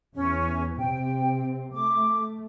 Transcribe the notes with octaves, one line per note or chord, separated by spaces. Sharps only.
E2 E3 C#4
C3 C4 G5
A3 D6